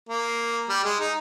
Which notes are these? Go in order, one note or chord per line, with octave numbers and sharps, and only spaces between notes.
A#3
G3
G#3
D#4